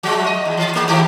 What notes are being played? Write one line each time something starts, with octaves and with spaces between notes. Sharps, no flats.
F3 G#3
D#5
E2
E3
E2 A3
D#3 A3 G4